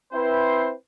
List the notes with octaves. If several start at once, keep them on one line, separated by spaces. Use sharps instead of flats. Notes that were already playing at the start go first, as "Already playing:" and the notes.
C4 E4 B4 C5